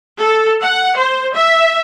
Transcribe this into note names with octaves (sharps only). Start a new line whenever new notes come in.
A4
F#5
C5
E5